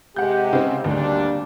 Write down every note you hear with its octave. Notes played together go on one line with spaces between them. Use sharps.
C3 G#3 G4 F#5 G6
C#3 C4
D2 G3 A#3 D4